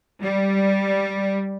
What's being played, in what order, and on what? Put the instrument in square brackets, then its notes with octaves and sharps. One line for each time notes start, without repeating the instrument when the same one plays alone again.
[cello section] G3